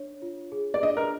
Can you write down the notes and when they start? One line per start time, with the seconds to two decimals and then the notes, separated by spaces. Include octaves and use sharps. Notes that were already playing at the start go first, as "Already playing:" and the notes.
Already playing: D4 C#5
0.22 F4
0.52 G#4
0.74 D5
0.83 D4 D#5
0.97 A#4